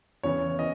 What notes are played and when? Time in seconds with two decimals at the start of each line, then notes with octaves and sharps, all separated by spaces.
0.23 E2 C#3 E3 C#5
0.59 E3 D#5